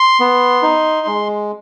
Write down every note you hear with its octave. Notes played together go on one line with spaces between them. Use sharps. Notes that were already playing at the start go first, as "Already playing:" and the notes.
Already playing: C6
B3
D#4
G#3